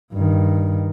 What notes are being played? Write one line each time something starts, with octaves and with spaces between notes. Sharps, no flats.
G2 D#3